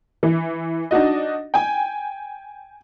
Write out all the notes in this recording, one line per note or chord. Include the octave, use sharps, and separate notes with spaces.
E3
D4 D#4 F#4 D#5
G5 G#5